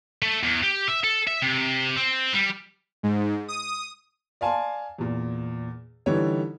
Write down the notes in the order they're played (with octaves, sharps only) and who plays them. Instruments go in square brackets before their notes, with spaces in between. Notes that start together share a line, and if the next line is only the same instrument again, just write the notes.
[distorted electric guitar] A3
E2
G4
E5
A4
E5
C3
C4
G3
[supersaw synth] G#2
D#6
[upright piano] D5 F5 G#5 A5 C6
E2 A#2
D3 E3 G3 D#4 C#5